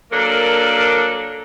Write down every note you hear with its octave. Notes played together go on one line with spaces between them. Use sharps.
F#3 A#3 D4 A4 A#4